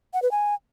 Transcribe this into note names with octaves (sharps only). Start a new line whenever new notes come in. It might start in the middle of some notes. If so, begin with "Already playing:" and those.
F#5
B4
G#5